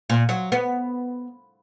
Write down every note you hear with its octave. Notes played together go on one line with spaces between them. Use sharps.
A#2
F#3
B3